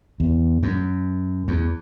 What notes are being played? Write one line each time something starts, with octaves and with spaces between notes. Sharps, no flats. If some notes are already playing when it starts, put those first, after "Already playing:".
E2
F#2
E2